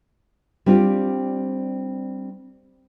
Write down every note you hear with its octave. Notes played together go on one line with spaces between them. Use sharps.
G3 C4 D4 F4 G4